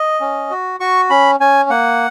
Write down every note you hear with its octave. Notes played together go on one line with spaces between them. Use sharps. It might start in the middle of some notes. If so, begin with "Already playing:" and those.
Already playing: D#5
C#4
F#4
F#4 C#6
C#4 B5
C#4 G#5
A#3 F#5